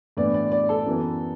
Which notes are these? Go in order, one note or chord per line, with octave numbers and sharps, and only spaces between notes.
A2 E3 B3 D4 D5
D5
D5
A4
F#2 E3 B3